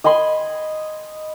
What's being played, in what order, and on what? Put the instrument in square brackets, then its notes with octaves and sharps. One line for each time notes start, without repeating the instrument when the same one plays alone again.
[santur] D#5 G#5 B5 C6